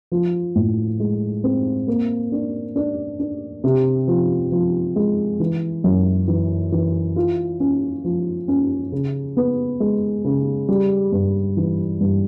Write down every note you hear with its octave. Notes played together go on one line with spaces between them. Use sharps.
F3
A2
G#3
C4
A#3
D4
D4
D4
C3
F3
F3
G#3
E3
F#2
E3
E3
F4
C#4
F3
C#4
C#3
B3
G#3
C#3
G3
G2
E3
G2